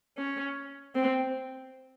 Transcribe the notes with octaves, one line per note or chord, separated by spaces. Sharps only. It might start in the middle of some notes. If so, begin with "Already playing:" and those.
C#4
C4